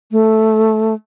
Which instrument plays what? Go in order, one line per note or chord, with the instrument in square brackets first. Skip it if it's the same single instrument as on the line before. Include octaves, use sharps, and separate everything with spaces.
[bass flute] A3